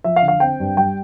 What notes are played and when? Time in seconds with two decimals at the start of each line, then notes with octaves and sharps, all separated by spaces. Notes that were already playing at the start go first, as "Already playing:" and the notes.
0.04 F3 E5
0.16 F5
0.22 D3
0.28 F5
0.40 C4 G5
0.60 G2
0.77 G3 G5